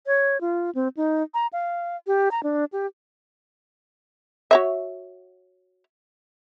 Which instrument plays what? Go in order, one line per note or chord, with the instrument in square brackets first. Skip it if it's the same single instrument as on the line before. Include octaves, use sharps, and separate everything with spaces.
[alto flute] C#5
F4
C4
D#4
A#5
F5
G4
A#5
D4
G4
[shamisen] F#4 C#5 E5